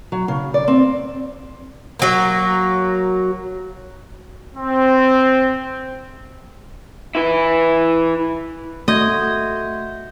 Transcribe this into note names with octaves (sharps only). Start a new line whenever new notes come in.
F#3
C#3
D5
C4
F#3 A#3
C4
E4 B4
A3 F#4 D#5 E5 C6 G6 G#6